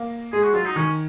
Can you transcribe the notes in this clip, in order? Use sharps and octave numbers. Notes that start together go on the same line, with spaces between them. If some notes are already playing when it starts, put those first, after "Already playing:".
Already playing: A#3
G#3 G#4
F#4
F#3 F4
D#4
D#3 C#4